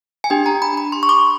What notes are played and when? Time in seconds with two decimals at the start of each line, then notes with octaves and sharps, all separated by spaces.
0.24 G#5
0.30 D4 G4 G5
0.46 A#5
0.62 B5
0.77 B5
0.92 C6
1.03 C#6
1.09 D6